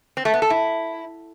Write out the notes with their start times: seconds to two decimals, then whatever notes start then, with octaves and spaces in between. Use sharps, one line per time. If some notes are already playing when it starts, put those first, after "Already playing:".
0.17 C4
0.25 A3
0.34 B3
0.42 A4
0.50 E4